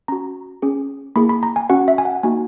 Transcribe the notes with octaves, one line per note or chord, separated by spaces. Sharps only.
C#4 F#4 A#5
C#4 G#4
A#3 E4 G#4 B5
B5
A#5
G#5
C#4 F#4 F#5
E5
G#5
F#5
A#3 D#4 F#4 G#5